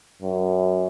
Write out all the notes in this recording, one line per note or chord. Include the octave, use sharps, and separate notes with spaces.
F#2